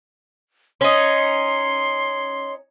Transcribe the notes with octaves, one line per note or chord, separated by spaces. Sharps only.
C#4 D#4 C6